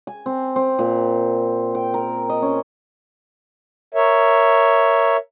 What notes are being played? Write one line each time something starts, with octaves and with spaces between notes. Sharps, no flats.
G#5
C4
C4
A#2
G5
A#4
D#5
C#4
A#4 C#5 E5